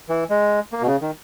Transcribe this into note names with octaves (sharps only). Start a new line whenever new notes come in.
E3
G#3
A#3
B2
C#3
D#3